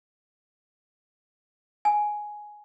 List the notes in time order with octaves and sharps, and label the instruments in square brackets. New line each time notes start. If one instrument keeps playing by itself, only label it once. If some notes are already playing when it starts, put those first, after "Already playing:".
[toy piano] G#5